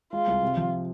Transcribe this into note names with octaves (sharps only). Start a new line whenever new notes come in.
G#3 F4
C2
C3
F3